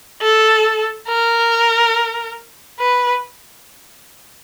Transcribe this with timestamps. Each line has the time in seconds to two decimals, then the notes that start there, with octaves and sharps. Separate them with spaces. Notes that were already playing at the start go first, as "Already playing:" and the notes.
0.22 A4
1.08 A#4
2.80 B4